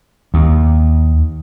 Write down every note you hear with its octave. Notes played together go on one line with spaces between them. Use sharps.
D#2